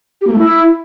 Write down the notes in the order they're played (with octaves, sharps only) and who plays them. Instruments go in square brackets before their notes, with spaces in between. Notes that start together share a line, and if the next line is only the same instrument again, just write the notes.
[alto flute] G4
A#3
A3
E4